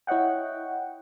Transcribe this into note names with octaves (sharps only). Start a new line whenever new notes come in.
E4 C#5 D#5 F#5 G5